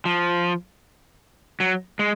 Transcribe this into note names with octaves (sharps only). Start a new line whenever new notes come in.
F3
F#3
G#3